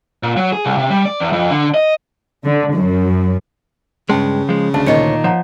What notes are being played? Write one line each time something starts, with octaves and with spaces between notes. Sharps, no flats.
A#2
F#3
G#4
C2
C3
G3
D5
E2
F2
D3
D#5
D3
F#2
G2 C#3 G#3 G5 A5 C6
F3 G#3
D2 D4 F5 A5
D2 A#2 D#3 D4 C#5 D#5
F3 C#5 F#5 A#5